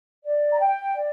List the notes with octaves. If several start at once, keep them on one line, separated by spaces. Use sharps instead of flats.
D5
A#5
G5
D5